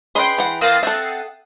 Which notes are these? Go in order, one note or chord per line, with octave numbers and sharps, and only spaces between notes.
C#4 G#4 B4 D#5 G5 B5 C6
E3 F#5
A#3 C4 C6 D#6 A6 C7
C4 A4 E5 F#5